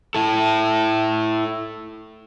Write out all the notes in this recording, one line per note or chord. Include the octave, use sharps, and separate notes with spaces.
E4 A4